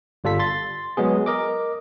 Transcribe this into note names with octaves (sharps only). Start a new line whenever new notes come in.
G1 G3 F4 A4 B6
C6 A6
F#3 G#3 B3 G#4
A#4 D#5 D6